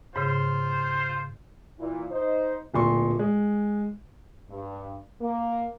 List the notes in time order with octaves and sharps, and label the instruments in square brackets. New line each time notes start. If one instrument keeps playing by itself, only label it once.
[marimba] G#2 C#3 [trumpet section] F4 C5
[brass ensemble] A#2 E3
D#4 C5
[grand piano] D1 A#2 D5 C6 C#6
G#3
[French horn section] G2
A#3